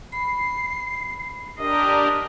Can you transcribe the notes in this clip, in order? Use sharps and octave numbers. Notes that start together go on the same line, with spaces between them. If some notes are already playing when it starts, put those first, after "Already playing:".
B5 C7
D4 G4 A#4 D#5